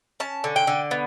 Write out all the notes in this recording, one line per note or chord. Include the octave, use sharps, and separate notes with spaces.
C#4 A5
D3
G5
D3
B3